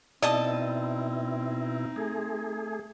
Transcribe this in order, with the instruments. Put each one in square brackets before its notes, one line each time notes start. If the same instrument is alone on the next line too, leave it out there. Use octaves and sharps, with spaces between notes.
[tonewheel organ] B2 E4 [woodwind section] C4 D#4 [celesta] D5 [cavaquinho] D#5 A5 D#6
[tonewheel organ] A3 G#4